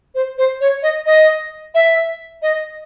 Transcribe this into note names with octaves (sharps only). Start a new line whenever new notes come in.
C5
C5
C#5
D#5
D#5
E5
D#5